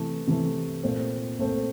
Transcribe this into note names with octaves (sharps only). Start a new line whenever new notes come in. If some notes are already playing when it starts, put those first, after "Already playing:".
Already playing: C3 E3 A3
C3 E3 A3
A#2 A3 C4
A#2 A3 C4